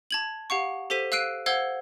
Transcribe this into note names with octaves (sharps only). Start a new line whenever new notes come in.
A5 G#6 F#7
G4 F5 F#5 C#6
G4 A4 C5 B6 D#7
F5 E6 F#6 C7 D7 D#7
C5 F5 F#5 E6 G#6 G7